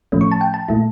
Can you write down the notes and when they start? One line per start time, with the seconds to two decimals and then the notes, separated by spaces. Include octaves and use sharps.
0.12 A2 F3 A3 C#4
0.21 C#6
0.32 A5
0.41 G5
0.54 A5
0.68 A#2 A3 E4